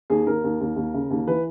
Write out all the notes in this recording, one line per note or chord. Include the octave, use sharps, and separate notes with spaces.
D#2 G#4
D#2 A#4
D#2
D#2
D#2
C#3
D#2
E3 B4